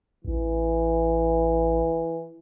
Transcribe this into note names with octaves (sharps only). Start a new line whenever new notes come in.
A1 E3